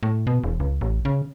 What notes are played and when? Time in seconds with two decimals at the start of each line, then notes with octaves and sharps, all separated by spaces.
0.03 A2
0.27 B2
0.44 E1
0.60 C#2
0.81 A1
1.05 C#3